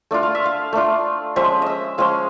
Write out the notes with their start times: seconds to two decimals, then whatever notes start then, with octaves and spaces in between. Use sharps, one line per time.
0.11 A3 D4 F4
0.23 F5
0.35 E5
0.45 F5
0.73 A3 D4 F4
1.36 F3 G#3 C#4 E5
1.62 D#5 E5
1.98 F3 G#3 C#4 F5